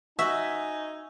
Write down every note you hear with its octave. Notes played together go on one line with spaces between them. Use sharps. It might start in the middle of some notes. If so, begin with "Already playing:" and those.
D#4 F#4 E5 G#5